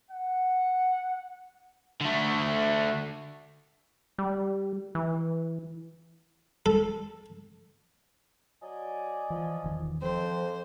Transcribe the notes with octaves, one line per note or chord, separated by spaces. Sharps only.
F#5
D3 A3
G3
E3
A4
F#3 D5 D#5 G#5
E3 F3
E1 D#3 E3
F2 F3 C4 C5